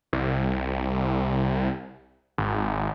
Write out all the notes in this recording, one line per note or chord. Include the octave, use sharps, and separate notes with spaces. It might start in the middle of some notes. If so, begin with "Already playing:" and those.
C2
G#1